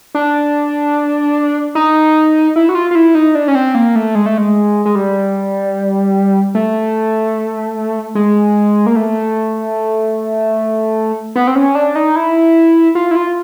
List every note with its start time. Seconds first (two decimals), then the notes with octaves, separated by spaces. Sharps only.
0.15 D4
1.75 D#4
2.56 E4
2.69 F#4
2.75 F4
2.91 F4
2.95 E4
3.15 D#4
3.35 D4
3.48 C#4
3.55 C4
3.75 A#3
3.96 A3
4.15 G#3
4.26 A3
4.38 G#3
4.85 G#3
4.95 G3
6.55 A3
8.15 G#3
8.86 A#3
8.96 A3
11.36 B3
11.47 C4
11.55 C#4
11.75 D4
11.96 D#4
12.16 E4
12.95 F4
13.11 E4
13.16 F4